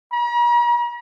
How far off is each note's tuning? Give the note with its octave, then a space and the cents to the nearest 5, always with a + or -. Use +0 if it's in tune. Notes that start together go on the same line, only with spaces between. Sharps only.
A#5 +45